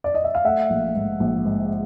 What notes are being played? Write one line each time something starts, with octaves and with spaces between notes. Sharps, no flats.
D5
D#5
E5
F5
A3 E5 F#5
A#1
G#2
A#1
G#2